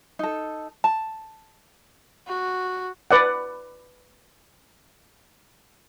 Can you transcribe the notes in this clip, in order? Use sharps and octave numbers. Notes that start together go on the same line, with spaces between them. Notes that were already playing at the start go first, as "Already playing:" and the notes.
D#4 A4
A5
F#4
B4 D5 F#5